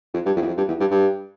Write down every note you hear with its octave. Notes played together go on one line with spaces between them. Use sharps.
F2
G2
F2
E2
F2
G2
E2
G2
G2